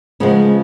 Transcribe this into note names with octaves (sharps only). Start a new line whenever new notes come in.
C#3 F3 G#3 B3